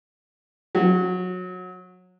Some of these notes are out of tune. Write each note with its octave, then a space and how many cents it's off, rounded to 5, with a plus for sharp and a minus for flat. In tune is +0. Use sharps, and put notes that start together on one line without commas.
F#3 -25